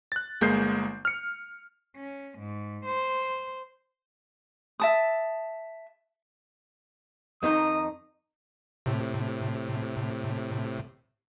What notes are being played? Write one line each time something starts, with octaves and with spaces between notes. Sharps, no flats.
F#6 A6
G1 G#3 A#3 G6 C7
F6 C#7
C#4
G#2
C5
E5 A5 D#6
F2 D#3 D#4 D#5 A#5 D#6
A2 C3